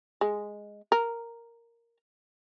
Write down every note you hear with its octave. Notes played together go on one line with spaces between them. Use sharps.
G#3
A#4